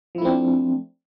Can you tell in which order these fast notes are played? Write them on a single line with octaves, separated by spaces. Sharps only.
F3 E4 A3 C4 D4